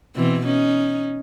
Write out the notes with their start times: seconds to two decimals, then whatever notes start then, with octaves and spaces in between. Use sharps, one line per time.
0.16 B2 E3 C4
0.45 C#4 D#4